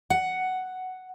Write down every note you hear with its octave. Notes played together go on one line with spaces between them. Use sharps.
F#5